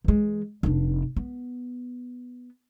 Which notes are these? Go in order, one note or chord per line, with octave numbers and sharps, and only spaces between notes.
E3 G#3
F1 D4
B3